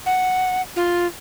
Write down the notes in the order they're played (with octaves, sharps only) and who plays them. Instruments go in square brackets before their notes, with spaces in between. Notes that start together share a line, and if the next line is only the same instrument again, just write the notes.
[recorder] F#5
F4